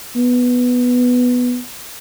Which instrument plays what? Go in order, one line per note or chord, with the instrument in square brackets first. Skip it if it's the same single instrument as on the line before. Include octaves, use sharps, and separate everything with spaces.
[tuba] B3